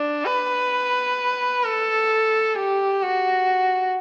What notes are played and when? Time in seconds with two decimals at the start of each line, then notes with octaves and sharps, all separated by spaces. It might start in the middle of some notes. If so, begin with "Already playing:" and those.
Already playing: D4
0.25 B4
1.63 A4
2.55 G4
3.02 F#4